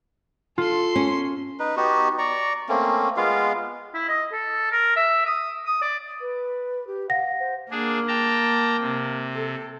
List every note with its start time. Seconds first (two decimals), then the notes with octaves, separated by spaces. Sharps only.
0.58 F4 A4 C6
0.96 C#4
1.60 D#4 B4
1.77 B3 D#4 F#4 G4
2.18 D5 A#5 C#6
2.69 A3 A#3 C4 C#4
3.17 G#3 B3 F4 F5
3.94 E4
4.09 D#5
4.32 A4
4.72 A#4
4.96 E5
5.26 D#6
5.65 D#6
5.82 D5
6.21 B4
6.87 G4
7.10 F5 F#5 A#6
7.40 C5
7.71 A#3 D4 G#4
8.08 G5 A5 A#5
8.81 C3
9.34 A4